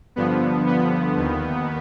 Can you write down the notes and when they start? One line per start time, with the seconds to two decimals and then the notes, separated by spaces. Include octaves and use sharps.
0.16 G2 D3 F3 B3
0.67 B3
1.17 D#2 D#3